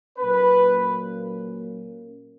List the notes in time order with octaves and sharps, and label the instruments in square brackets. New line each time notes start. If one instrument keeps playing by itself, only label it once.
[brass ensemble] A#2 F#3 A#3 C#4 B4